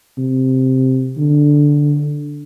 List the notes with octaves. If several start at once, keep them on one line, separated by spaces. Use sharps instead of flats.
C3
D3